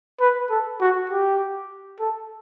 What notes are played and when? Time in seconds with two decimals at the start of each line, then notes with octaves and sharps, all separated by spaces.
0.20 B4
0.50 A4
0.81 F#4
1.10 G4
2.00 A4